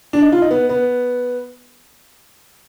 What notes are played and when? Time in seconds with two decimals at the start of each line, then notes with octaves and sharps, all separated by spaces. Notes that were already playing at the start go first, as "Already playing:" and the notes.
0.13 D4
0.22 D#4
0.32 F4
0.42 D#4
0.51 B3
0.69 B3